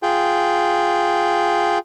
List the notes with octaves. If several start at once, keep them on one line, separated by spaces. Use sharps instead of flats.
F4 G#4 G5